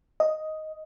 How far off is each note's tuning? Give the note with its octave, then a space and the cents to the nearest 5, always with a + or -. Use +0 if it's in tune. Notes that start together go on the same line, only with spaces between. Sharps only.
D#5 +5